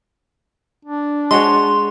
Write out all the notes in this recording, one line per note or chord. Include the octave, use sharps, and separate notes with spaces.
D4
G#3 F#4 C#5 C6